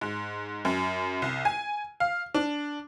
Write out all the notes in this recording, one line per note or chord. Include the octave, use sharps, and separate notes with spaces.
G#2
F#2
C2
G#5
F5
D4